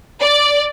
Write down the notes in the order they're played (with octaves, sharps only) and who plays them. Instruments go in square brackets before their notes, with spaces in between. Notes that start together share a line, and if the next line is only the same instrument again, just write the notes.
[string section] D5